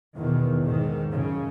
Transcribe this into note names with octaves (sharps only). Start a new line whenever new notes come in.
E2 B2 D#3
G#2 D#3
F#2 C#3